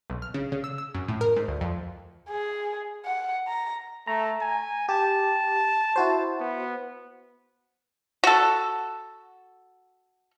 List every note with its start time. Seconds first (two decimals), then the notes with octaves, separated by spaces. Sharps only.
0.10 B1
0.22 F6
0.34 C#3
0.52 C#3
0.64 E6
0.78 E6
0.95 F#2
1.08 A2
1.21 A#4
1.36 G#2
1.48 D2
1.61 F2
2.29 G#4
3.05 F#5
3.47 A#5
4.07 A3 A#5
4.41 G#5
4.89 G4 A5
5.96 E4 F#4 C5
6.40 B3
8.24 F#4 A4